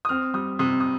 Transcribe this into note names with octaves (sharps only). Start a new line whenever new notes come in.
D#6
C4 F6
G3 D#6
C3 D#6
D#6